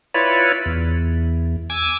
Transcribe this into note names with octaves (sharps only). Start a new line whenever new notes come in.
E4 F4 B4 C#5 D5
E2
G#5 D6 E6